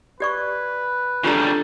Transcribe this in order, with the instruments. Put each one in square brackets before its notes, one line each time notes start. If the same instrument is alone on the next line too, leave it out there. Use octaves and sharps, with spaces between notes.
[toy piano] G4 D5 C#6 [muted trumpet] B4
[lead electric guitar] C#3 G3 [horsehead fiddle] D4 A4 [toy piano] F4 G4 A#5